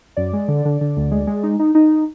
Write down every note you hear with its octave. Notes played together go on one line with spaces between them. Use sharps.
F#2 D5
G#3
D3
D3
D3
D2
G#3
G#3
D#4
D#4
D#4